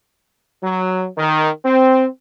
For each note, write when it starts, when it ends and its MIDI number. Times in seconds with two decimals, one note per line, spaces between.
0.62 1.07 54
1.17 1.50 51
1.65 2.07 60